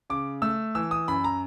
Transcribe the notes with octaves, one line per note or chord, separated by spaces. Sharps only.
C#3 D6
A3 E6
E3 E6
D#6
F#2 B5
A#5